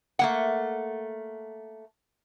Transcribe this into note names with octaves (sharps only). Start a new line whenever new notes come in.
A3 A#3 F#5